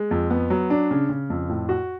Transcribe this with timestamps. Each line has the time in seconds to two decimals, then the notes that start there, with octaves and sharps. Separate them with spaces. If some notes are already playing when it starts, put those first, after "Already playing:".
Already playing: G#3
0.11 F2
0.30 B3
0.50 F#3
0.70 D4
0.91 C#3
1.09 C#3
1.30 F2
1.49 A2
1.69 F#4